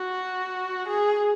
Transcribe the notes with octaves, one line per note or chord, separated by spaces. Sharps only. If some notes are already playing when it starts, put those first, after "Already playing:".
Already playing: F#4
G#4